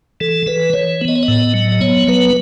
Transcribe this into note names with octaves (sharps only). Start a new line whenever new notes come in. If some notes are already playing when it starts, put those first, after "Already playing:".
E3 A4
E3 B4
E3 C#5
B3
D#5
C#5
D#5
A2
F#3
D#5
B3 C#5
F#3 B4